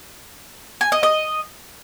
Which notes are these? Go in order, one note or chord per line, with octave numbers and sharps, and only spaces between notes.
G#5
D#5
D#5